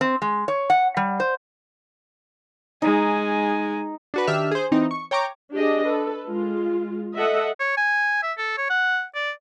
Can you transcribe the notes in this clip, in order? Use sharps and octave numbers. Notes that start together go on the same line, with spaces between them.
C4
G#3
C#5
F#5
G3
C5
G#3 D#4 G#5
D4 F#4 B4
D#3 D4 G4 E5 E6 F6
G#4 C5
E3 C4 D#4
C#6
C#5 G5 A#5 C#6 D6
D4 G4 G#4 D#5
A4 B4
G#3 F4
A4 D#5 E5 F#5
C#5
G#5
E5
A4
C#5
F#5
D5